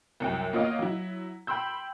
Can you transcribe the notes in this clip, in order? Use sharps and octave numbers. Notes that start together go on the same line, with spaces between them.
C2 F#2 G5
A#3 B3 F4 C#5 D#5 F5
F#3 E4
G5 B5 C6 E6 G6